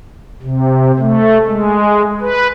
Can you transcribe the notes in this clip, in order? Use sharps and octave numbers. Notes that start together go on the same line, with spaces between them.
C3
A3
G#3
B4